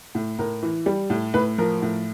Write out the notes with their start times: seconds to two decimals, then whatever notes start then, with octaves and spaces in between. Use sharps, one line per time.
0.15 A2
0.39 A2 A#4
0.63 E3
0.86 G3
1.10 A2
1.34 A2 B4
1.58 F3 A#4
1.82 A2